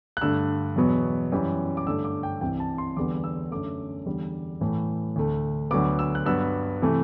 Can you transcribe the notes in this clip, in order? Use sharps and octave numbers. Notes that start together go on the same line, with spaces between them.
F#6
G2 D3 A3 E6
E2 B2 F#3 B3
F#2 E3 G3
D6
G2 D3 A3 E6
D6
G5
C2 C3 E3 G5
A5
C6
E2 D3 G3 B3 D6
E6
F#2 D3 A3 D6
E2 D3 G3
A2 E3 A3
D2 D3 A3
D2 D3 F#3 B3 D6
E6
F#6
G2 F#3 B3 E6
C3 E3 A3